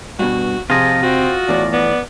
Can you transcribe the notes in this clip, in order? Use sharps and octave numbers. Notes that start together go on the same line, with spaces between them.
G2 B2 F#4
C3 F3 F4 G#4 D#5
C4 F#4
E2 A2 D5
B3 D5